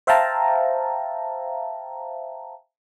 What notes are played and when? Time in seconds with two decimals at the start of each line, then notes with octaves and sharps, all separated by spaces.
0.07 C5 E5 F5 G5 A5 A#5